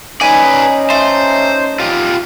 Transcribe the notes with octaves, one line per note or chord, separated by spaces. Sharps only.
C#4 D#4 B4 D5 G#5
A3 C5
F4 G4